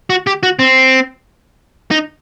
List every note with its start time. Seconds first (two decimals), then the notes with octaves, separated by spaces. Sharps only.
0.10 F#4
0.27 G4
0.43 F#4
0.59 C4
1.91 D#4